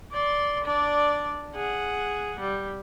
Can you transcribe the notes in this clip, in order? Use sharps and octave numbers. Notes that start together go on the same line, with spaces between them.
D5 C6
D4 D5
G#4 F#5
G3